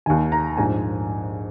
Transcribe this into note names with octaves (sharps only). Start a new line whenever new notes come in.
D#2 D#3 G#5
A#5
A#1 G#2 F3 G#5